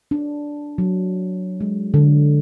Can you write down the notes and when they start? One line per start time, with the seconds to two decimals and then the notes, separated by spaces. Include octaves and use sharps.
0.11 D4
0.78 F#3
1.61 G#3
1.94 D3